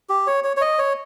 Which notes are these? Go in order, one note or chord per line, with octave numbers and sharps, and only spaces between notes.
G4
C#5
C#5
C#5
D#5
C#5